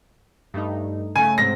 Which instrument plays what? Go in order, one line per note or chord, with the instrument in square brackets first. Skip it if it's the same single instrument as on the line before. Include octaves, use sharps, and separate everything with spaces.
[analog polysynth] G2 A3 D#4
[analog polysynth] C#3 A3 [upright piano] G#5
[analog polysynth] G#2 C3 C4 [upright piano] A#6